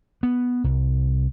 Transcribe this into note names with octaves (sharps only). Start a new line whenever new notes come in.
B3
C2